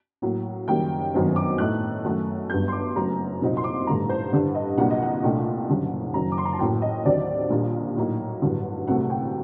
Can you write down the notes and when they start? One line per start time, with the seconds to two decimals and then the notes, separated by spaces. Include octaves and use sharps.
0.22 A2 F#3 A#3
0.68 F#1 F#2 D#3 G3 A#3 G5
1.14 G1 F#2 D#3 F#3 C4
1.36 D6
1.58 A2 A3 D#4 F#6
2.04 F#2 D#3 F#3 A3
2.50 G1 G2 F#3 G6
2.68 C6
2.72 D6
2.96 F#1 F#2 F#3 A3 A#5
3.42 C2 A#2 F#3 C4 D#4
3.57 C6
3.64 D6
3.87 A1 G2 D3 A3 A#5
4.09 C5
4.33 G2 D3 G3 D4
4.55 D#5
4.77 C2 A#2 F#3 A#3 D4 F#5
4.90 D#5
5.02 F#5
5.23 C2 A#2 A3 D4 G5
5.69 F#1 F#2 D3 G3
6.14 F#1 F#2 D#3 F#3 A#5
6.32 D6
6.38 C6
6.45 A#5
6.53 A5
6.59 A1 A2 F#3 A#3 G5
6.82 D#5
7.05 D#2 D3 F#3 C4 D5
7.50 A#1 A#2 G3 A#3 D4
7.97 A2 F#3 A#3 D#4
8.42 A1 G2 D3 F#3
8.87 C2 C3 F#3 A3 C4 F#5
9.10 G5